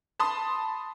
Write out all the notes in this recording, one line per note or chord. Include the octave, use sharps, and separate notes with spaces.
A5 B5 C6 D#6